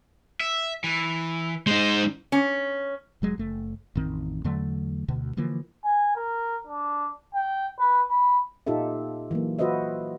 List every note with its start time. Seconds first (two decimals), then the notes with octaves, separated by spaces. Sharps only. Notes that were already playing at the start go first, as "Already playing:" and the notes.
0.40 E5
0.84 E3
1.67 G#3 D#4 C5
2.32 C#4
3.22 F1 F#3 G#3
3.38 F#1 A3
3.95 A1 F2 D#3 C4
4.44 E2 D3 F#3 A3
5.08 D2 B2 D3
5.37 D3 E3 F3 A#3
5.84 G#5
6.16 A#4
6.67 D4
7.35 G5
7.79 B4
8.11 B5
8.67 A#2 D#4 F4 G4 A4 E5
9.31 E3 F#3 A#3
9.59 F4 F#4 B4 C5 D#5 E5